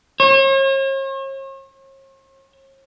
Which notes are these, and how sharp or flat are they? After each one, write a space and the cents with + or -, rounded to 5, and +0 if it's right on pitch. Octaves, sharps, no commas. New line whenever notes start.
C#5 -45